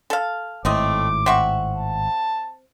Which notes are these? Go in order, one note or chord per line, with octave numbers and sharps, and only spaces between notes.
A4 F5
G#1 A2 A3 C4 D#5 D6
C4 E5 F#5 C#6
A5